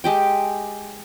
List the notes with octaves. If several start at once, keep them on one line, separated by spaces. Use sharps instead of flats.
G#3 G4 G5